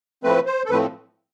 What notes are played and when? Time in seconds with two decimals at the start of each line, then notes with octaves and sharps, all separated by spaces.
0.23 A2 F3 A3 C4 B4
0.46 C5
0.65 A4
0.70 A2 F3 A3 C4 B4